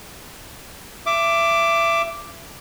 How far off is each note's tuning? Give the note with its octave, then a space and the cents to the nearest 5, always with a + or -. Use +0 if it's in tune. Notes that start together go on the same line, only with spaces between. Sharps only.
E5 +25 D6 +0